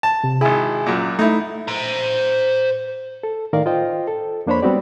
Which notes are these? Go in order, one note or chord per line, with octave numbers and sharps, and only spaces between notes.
A5
C3
G#1 E4 G#4 G#5
F#2 A#2
A3 D#4 E4
C5 A#5
A4
A2 D#3 A#4 D5 F5
F4 C5 D#5 G5
A4
F2 A#3 D4 C5 C#5 B5
G3 B3 C4 F#4 G4 D5